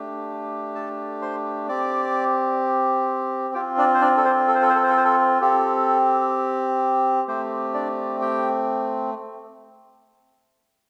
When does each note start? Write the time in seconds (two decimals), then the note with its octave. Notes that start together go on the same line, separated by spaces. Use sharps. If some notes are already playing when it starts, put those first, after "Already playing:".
Already playing: A3 D4 G4
0.75 A4 A5
1.22 C5 C6
1.68 C4 G4 D5 D6
3.54 C4 F4 G4 G5
3.78 D4 D5
3.94 C5
4.01 D4 D5
4.17 A4
4.25 C5
4.48 A4
4.55 C5
4.62 A4
4.70 C5
4.76 A4
4.83 C5
4.90 A4
4.97 C5
5.05 A4
5.41 C4 G4 A4
7.28 A3 C4 G4 C5
7.74 D4 D5
8.21 G4 G5